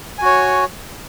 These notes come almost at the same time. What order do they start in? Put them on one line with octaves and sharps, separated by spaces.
G#5 F#4 C#5